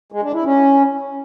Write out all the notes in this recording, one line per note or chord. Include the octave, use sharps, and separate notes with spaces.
G#3
D4
E4
C#4